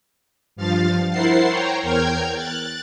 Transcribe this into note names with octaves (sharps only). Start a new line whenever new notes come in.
G2 F3 F5 A6
E4 A#4 C5 F#5 A6 C7
C5 C#5 G5 A#5
E2 A#4 G5 F6 G6 G#6
F#6 A6